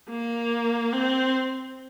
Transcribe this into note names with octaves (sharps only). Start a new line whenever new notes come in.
A#3
C4